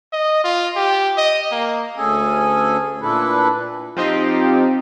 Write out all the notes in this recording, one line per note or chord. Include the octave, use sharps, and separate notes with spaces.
D#5
F4
G4
D#5
A#3
D2 C#4 G#4 A4 G#5
A#2 D4 E4 A4 B4
F3 C4 D#4 G4